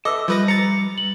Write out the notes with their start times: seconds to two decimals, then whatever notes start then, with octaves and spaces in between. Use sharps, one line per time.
0.05 A4 B4 D#5 E5 D6 E6
0.28 F3 G3 B4 A#6
0.48 A#5 A6 C#7
0.98 F#7